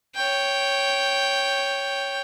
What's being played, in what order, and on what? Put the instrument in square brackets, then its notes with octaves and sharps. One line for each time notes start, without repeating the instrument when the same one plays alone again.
[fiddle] C#5 G5